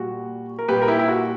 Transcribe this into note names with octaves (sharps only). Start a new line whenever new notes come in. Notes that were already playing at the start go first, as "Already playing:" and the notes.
Already playing: A#2 G3 F#4
A#4
A#2 G3 G4 B4
A#4
E4 G4
E4
F#4